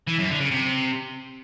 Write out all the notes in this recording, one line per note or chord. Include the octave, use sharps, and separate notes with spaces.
E3
F#2
D3
C#3
C3